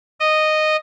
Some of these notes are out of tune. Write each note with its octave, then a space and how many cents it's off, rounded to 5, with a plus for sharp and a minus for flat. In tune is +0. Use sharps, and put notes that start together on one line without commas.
D#5 -10